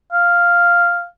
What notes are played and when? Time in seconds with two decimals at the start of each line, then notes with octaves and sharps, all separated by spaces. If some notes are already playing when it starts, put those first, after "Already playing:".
0.12 F5